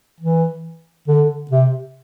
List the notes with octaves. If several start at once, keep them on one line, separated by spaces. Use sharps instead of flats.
E3
D3
C3